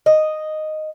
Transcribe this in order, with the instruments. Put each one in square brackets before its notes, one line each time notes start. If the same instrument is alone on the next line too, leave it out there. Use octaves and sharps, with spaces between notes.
[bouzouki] D#5